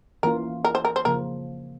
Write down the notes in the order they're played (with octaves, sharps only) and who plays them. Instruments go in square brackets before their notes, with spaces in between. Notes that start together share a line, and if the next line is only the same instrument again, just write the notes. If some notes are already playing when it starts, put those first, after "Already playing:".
[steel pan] E3 A#3 C#4 F4 [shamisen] A#4
[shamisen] A#4
C5
A#4
C5
[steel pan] C#3 F3 A#3 [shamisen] A#4